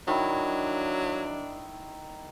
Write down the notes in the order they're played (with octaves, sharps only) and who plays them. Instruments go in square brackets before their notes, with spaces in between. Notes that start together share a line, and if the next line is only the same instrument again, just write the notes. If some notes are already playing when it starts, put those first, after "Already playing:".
[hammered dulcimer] D#3 E4 [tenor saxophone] F#3 [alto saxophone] D4